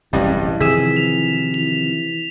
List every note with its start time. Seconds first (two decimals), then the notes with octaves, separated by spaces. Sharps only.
0.13 D1 A1 G2 C3 E3 G3 D#5
0.60 C3 D#3 F3 G#4 E6 B6 E7
0.97 F7
1.54 E3 F7